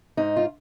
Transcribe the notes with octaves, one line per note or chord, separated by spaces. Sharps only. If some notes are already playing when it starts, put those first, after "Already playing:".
G#2 D#4
F4